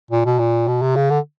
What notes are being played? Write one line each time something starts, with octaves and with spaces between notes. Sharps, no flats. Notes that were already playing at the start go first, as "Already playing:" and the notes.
A#2
B2
A#2
B2
C3
C#3
D3